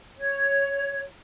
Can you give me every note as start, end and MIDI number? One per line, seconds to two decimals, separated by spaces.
0.18 1.02 73